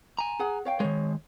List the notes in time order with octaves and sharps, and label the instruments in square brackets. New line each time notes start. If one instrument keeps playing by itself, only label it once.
[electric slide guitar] G#5 A#5
[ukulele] G#4 F#5
C#5 F5 G5
[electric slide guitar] D#3 G#3 [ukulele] C#5